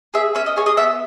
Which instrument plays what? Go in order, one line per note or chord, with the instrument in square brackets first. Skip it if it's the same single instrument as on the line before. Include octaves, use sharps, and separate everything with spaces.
[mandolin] G#4 E5
C#4 E5
D#5
G#4 C#5
D#5
B3 E5